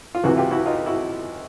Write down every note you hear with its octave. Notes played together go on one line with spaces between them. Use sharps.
F4
C#2 C3 E3 E4 F#4
F4 G4
E4 F#4
D#4 F4
E4 F#4